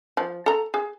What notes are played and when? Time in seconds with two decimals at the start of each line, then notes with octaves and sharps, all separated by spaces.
0.17 F3
0.46 A4 A#5
0.74 G#4